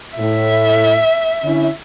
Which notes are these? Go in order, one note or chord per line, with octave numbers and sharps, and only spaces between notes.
A2 E5
D3 C#4 E4